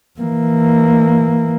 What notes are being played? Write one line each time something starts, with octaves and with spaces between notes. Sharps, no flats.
E3 A#3